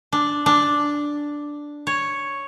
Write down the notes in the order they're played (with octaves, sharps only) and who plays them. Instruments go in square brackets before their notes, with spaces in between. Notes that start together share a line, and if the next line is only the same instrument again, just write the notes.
[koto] D4
D4
C#5